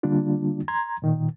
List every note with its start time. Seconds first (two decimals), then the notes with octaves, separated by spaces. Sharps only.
0.03 D3 G3 A#3 D4 F4
0.68 A#5 C6 G#6
1.02 A#2 D#3